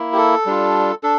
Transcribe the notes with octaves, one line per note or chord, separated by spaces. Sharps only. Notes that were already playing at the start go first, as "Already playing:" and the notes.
Already playing: A#3 E4
G4
A4
G3 D4 F4
D4 A4